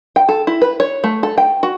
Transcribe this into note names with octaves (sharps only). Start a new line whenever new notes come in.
G5
A4
E4
B4
C#5
A3
A4
G5
F#4